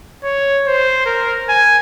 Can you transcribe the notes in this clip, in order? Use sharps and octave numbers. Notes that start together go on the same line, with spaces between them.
C#5
C5
A#4
G#5